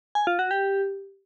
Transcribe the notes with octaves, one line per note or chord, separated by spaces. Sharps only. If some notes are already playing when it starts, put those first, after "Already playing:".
G#5
F4
F#4
G4